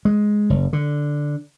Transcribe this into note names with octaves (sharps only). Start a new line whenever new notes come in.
G#3
F#1
D3